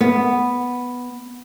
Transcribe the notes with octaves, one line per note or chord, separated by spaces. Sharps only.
B3